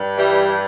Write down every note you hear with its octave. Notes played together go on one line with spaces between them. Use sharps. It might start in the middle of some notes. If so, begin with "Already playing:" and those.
Already playing: G2
E3 G3